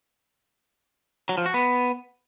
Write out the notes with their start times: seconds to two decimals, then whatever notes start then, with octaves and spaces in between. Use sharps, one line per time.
1.29 F#3
1.38 F3
1.46 F#4
1.54 B3